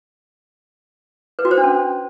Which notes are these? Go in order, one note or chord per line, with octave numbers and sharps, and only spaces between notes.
B4
F#4
C5
D4
C#4